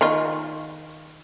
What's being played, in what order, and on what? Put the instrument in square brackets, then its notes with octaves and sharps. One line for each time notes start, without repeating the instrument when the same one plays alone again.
[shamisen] D#3 F4